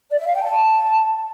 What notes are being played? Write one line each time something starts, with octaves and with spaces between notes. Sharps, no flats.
D5
E5
F5
G5
A5